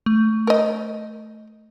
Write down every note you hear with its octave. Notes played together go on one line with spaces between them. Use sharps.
A3
A#4 D#5